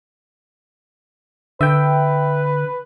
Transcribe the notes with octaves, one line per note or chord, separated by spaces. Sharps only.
D3 B4 E5 G5